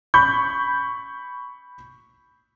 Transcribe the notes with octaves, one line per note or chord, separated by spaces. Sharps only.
B5 C#6 G6